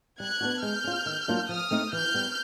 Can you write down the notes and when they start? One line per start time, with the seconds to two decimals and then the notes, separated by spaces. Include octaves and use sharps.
0.19 G3 F#6 G#6
0.41 B3 D4 F#4
0.63 G#3 F6 G6
0.84 C#4 F4
1.06 D#3
1.28 F#3 A#3 D4 F4
1.49 F3 D#6 F6
1.71 A3 C4 D#4
1.93 E3 F6 G6
2.14 G3 B3